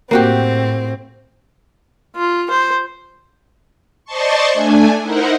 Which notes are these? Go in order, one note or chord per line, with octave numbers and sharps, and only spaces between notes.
A2 A#3 C4 F#4 G4
F4
C5
C5 D5 D#5 A5 C6 C#6
A3 D4 G#5
D#4 E4 A#4 C5 F#5